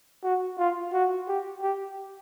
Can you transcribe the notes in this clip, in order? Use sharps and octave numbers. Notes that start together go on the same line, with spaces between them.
F#4
F4
F#4
G4
G4